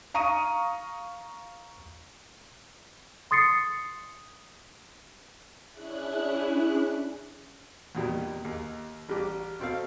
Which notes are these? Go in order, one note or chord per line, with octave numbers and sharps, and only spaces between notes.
F5 A#5 C#6 D#6 D#7
C6 D#6 A6 C7 C#7
C#4 D4 E4 G#4 F#6
E2 A#2 D#3 G3
D#2
A1 G3 G4 D6
B2 C4 A4 F5